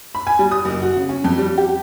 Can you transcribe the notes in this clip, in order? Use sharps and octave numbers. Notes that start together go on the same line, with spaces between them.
B5
G#5
G3
D#6
F#1
F#4
C#3
C#4
F2
G3
G4